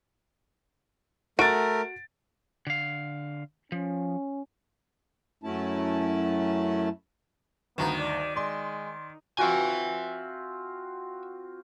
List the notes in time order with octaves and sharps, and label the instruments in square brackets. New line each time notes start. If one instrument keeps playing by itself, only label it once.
[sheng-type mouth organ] A3 A#4 [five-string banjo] F#4 [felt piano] A6 D7
[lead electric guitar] D3 F5
[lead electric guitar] F3 [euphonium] C#4
[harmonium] F#2 F#3 A3 C#4 E4 A5
[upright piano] G1 D2 A#5 [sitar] D#3 [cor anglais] B3
[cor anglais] D5
[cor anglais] G#3 [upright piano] D5 C6
[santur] C4 F4 F#4 [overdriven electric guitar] E5 G#5